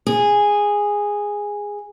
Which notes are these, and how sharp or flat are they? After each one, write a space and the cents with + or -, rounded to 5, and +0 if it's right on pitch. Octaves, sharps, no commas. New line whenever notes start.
G#4 -10